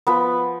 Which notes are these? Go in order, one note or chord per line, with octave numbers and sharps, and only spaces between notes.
F3 B3 B4